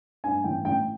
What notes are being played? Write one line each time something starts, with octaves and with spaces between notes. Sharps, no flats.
G2 G#5
A1 G5
A1 G5